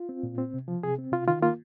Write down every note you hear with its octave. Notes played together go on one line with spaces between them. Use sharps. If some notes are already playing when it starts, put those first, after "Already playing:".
Already playing: F4
C4
A#2
C4
C3
F3
C3 G#4
C4
C3 F4
D#3 F4
A#3 F4